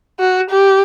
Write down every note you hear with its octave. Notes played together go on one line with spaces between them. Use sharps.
F#4
G4